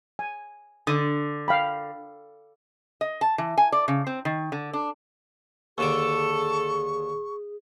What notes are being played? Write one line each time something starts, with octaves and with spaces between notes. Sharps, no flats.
G#5
D3 D#6
F5 G5 B5
D#5
A5
E3
G#5
D5
C#3
C4
D#3
D3
D4
D#2 D3 G#4 A4 C#6 D6